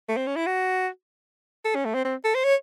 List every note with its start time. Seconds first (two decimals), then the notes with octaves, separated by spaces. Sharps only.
0.09 A3
0.17 C4
0.27 C#4
0.36 E4
0.47 F#4
1.65 A4
1.75 C#4
1.85 A3
1.94 C4
2.05 C4
2.24 A4
2.35 C5
2.44 C#5